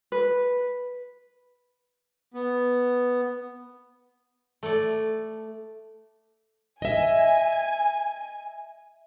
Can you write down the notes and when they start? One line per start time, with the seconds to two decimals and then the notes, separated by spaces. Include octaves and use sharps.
0.12 B4
2.34 B3
4.63 A3 D5
6.82 D#5 E5 G#5